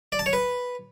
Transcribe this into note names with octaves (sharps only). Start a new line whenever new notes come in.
D5
A5
C#5
B4